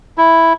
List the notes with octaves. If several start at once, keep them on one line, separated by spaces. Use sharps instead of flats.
E4